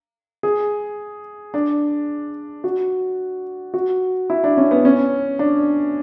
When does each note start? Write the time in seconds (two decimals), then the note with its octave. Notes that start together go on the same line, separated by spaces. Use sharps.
0.43 G#4
1.54 D4
2.64 F#4
3.74 F#4
4.30 E4
4.44 D4
4.57 C#4
4.71 B3
4.85 C#4
5.39 D4